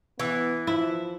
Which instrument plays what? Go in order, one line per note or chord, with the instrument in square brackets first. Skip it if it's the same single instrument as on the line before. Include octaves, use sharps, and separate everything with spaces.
[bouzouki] E3 [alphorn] B3
[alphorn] F3 [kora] E4